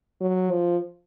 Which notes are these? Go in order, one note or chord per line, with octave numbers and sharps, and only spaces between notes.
F#3
F3